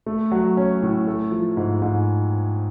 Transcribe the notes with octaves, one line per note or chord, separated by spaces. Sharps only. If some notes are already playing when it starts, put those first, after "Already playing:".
A3
F#3
C#4
A2
A3
F3
G#2
G#2